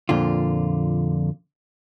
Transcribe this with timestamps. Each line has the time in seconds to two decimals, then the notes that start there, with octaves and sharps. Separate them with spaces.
0.09 F2 A#2 D3 F4